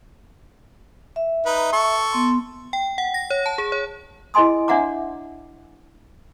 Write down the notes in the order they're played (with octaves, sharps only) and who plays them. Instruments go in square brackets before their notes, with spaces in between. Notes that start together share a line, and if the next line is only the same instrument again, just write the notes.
[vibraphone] E5
[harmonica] D#4 B4
A4 C#6
[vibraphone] B3 C6
[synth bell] G5
F#5
A#6
C#5
A5
G#4
C#5
[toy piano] E4 G#4 D#5 G#5 C6 D#6
D4 C#5 E5 F#5 A#5 D6